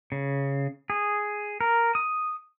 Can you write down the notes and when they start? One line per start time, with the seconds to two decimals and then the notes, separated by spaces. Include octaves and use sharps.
0.12 C#3
0.90 G#4
1.61 A#4
1.95 D#6